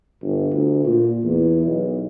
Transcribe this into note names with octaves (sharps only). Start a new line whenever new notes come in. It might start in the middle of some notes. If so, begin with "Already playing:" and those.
G1
D2
A#2
E2
B1